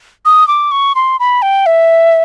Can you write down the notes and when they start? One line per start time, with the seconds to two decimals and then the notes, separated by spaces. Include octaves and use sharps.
0.25 D#6
0.48 D6
0.71 C#6
0.95 C6
1.20 B5
1.42 G5
1.66 E5